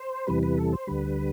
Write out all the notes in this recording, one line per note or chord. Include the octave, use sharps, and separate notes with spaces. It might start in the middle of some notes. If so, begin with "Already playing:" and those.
Already playing: C5
E2 C3 E3 G3 B4
B4
A4
C5
D2 D3 G3 B4